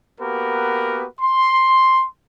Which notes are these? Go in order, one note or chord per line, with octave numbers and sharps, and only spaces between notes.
A#3 B3 F#4 G4 A#4 B4
C6